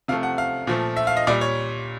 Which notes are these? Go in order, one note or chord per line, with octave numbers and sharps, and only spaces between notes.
C3 F3 A3 F5
F#5
F5
A#2 F3 A3
E5
F5
D#5
A#2 G3 D5
C#5